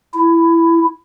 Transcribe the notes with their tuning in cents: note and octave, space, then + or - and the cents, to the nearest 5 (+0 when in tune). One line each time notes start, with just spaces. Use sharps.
E4 +15